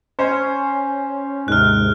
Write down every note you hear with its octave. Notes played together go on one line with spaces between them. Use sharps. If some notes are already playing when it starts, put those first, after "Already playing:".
C#4 C5
D#2 G#2 C3 F6 F#6